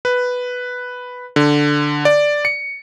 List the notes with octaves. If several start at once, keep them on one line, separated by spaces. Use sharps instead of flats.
B4
D3
D5
C#7